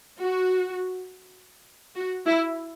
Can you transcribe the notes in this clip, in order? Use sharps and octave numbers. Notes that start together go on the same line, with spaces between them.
F#4
F#4
E4